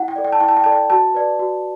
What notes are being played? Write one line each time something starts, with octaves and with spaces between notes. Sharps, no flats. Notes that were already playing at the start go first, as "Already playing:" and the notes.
Already playing: E4 F#5
G5
A4 D5
G5
A5
E4 G5
A5
G5
A4 D5 A5
G5
F#4 A5
B4 D5
F#4